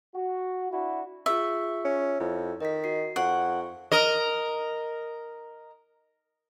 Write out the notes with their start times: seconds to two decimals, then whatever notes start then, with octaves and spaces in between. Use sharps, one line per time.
0.15 F#4
0.71 D4 E4 F#4
1.26 F4 G#4 E5 C#6
1.85 C#4
2.20 F2 E4
2.61 D#3 D#5 B6
2.84 F#4 C7
3.16 F2 F#5 C#6 D7
3.92 A#4 D#5